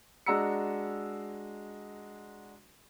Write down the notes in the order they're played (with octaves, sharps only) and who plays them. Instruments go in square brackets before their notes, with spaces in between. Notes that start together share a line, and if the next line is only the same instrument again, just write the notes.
[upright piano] G#3 D4 F#4 A#5 E6 C#7